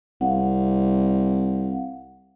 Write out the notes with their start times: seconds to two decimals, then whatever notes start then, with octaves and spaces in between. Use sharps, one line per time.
0.21 C2 F5 F#5